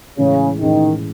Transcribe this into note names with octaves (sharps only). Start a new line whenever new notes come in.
A2 C#3 E3 G#3 C#4 G#4
A2 D#3 E3 G#3 C#4 G#4